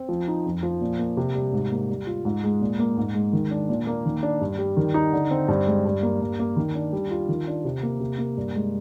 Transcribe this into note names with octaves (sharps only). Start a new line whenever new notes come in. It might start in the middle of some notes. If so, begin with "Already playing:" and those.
Already playing: C4
F3
D#4
F2
F3
A#2
A#3
C3
G3
G#2
A#3
G3
F4
G#2
G#3
A#2
A#3
G#2
G#3
D#3
D4
A#2
A#3
D#3
D4
G2
G3
D#3
D#4
D3
C4
G2
G#3
G2
A#3
G2
A#3
D#3
D4
G3
F4
D#3
D4
C3
A#3
C3
A#3
G2
G#3